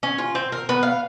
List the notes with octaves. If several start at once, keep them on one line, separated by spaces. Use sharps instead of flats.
C#4
F4
C4
A#4
B3
F5